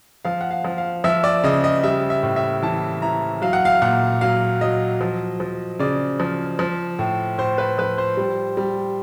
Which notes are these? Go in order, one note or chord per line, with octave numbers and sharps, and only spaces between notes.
F3 F5
F#5
F5
F3
F5
F3 E5
D5
C#3 D#5
D#5
G3 E5
E5
A2
E5
E3 A5
E3 A#5
F#3 F5
F#5
F5
A#2 F#5
F#3 F5
F#3 D#5
F3
F3
C#3 D5
F3
F3
A2
A2 C5
B4
F3 B4
C5
G3
G3